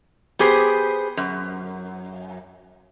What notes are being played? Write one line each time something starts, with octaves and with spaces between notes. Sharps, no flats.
B3 G4 G#4 C5
F#2